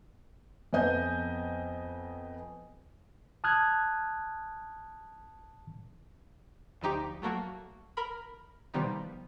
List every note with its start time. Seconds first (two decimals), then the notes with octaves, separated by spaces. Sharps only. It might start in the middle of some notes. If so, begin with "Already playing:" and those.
0.73 F2 B3 B4 D#5 G#5 G6
3.44 A5 D#6 F6 F#6 G#6
6.81 D2 F3 D#4 G4
7.22 F#3 A3 A#3 F#4
7.97 A#4 B5
8.74 B2 D#3 F3 G3 B3 D#4